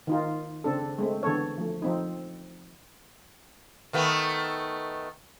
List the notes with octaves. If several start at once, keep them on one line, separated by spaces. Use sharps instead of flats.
D#3 D#4 F4
C#3 C4 D4 A4
G#3 A3 C4
D3 E3 B3 A4 C#5
F3 A3
F3 C4 D#4
D#3 A3 B3